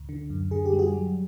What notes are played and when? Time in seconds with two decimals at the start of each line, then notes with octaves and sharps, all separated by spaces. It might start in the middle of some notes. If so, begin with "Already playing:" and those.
Already playing: D2
0.09 D3
0.30 F#2
0.51 D3 G#4
0.66 G4
0.73 G3
0.79 F#4 G#4
0.94 F#3